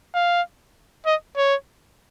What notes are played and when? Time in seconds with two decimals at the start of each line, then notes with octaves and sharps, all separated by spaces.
0.14 F5
1.06 D#5
1.36 C#5